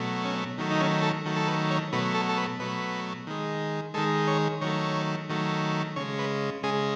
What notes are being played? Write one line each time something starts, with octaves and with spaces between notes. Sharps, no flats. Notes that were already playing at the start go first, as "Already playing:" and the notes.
Already playing: B2 F#3 A3
C#4
D#3 F#3 A3
D#4
C#4
A4
D#3 F#3 A3
A4
B4
C#5
B2 F#3 A3 B4
A4
A4
B4
B2 F#3 A3 B4
D#3 G#3
D#3 G#3 A4
C#5
D#3 F#3 A3 C#5
D#3 F#3 A3
C#3 G#3 C#5
B4
C#3 G#3 G#4